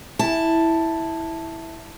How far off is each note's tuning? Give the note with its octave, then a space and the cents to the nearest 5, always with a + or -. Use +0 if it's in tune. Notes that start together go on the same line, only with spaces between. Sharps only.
E4 -5 A5 +5